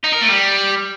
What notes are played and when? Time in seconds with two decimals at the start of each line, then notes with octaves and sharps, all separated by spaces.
0.04 D#4
0.12 A#4
0.21 A3
0.30 G3